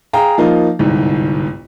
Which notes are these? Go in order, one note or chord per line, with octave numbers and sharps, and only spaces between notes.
G#4 F5 G5 A#5
F3 A#3 D#4 F4
G1 C2 G#2